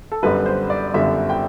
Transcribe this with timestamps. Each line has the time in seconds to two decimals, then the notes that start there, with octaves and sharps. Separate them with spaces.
0.12 A4
0.23 G1 F#2 D3 G3 B4
0.46 C5
0.70 D5
0.94 G1 F#2 D3 G3 E5
1.30 G5